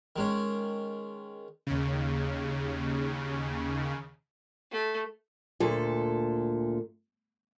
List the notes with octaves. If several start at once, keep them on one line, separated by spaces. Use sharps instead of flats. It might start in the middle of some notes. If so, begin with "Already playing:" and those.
D#3 G#3 C#4
D#2 C#3
A3
D2 A#2 A4